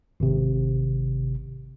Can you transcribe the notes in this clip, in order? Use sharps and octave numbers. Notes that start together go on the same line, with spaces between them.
G#1 C3